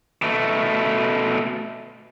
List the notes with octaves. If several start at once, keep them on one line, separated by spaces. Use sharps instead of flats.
B2 A3